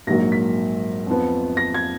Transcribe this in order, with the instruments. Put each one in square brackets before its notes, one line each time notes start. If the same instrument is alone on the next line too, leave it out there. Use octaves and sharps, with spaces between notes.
[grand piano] A#1 G#2 F#3 A#3 A#6
B6
F2 F3 B3
A#6
G#6